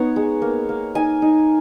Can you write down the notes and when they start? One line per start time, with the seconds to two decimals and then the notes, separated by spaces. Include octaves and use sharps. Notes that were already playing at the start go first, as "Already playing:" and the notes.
Already playing: B3 D#4 C#5 F#5
0.16 G#3
0.42 A#3
0.69 A#3
0.95 D#4 G#5
1.22 D#4